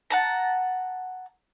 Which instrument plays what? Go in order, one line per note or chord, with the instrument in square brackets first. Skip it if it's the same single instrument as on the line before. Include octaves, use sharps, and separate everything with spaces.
[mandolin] F#5 A5 A#5